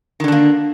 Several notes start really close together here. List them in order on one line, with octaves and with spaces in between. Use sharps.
D#3 D3 D4 A#3